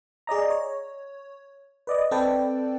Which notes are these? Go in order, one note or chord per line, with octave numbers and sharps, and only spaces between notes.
G#4 D5 D#5 A#5
C#5
B4 D5 D#5
C4 A4 B4 D5 G5 A5